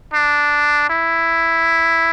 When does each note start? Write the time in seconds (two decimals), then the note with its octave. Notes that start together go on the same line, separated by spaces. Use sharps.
0.14 D4
0.90 E4